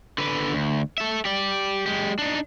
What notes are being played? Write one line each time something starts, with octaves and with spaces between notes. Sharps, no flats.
D3 B4
D2
A4 E5
G4 D5
G#3 G4
D4 D#4